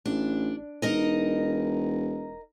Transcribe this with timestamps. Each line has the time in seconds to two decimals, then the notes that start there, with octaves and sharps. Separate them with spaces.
0.05 A1 D4
0.82 E1 D#4 A#4 D#5